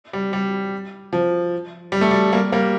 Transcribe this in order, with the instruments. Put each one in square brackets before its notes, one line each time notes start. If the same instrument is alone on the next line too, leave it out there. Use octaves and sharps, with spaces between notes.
[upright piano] G3
G3
F3
G3
A3
G3
G3 A#3
G3 A#3